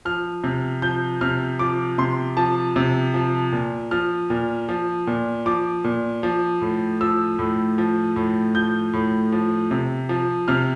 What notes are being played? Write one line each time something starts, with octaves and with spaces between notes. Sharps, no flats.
F3 F6
C3
F3 G6
C3 F6
F3 D6
C3 C6
F3 A5
C3
F3
A#2
F3 F6
A#2
F3
A#2
F3 D6
A#2
F3
A2
F3 E6
A2
F3
A2
F3 G6
A2
F3
C3
F3
C3 F6